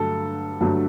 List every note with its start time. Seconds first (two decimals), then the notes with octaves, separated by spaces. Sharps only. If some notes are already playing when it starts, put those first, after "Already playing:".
Already playing: G2 D3 F#3 A3 A4
0.61 G2 D3 F#3 A3